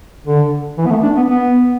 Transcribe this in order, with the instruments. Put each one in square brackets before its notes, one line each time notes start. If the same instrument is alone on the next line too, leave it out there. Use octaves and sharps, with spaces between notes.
[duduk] D3
E3
B3
A3
D4
B3
B3